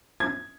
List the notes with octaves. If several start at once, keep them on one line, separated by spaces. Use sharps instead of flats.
G#6